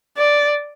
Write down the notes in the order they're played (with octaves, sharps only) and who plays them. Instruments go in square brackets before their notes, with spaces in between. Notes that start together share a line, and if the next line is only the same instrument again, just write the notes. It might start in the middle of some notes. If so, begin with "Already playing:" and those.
[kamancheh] D5